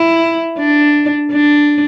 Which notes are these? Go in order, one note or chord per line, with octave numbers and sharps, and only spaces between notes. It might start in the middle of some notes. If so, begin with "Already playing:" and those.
Already playing: E4
D4
D4